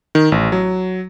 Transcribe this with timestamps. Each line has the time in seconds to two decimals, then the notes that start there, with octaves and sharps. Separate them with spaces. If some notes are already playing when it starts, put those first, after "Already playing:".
0.15 D#3
0.32 A1
0.52 F#3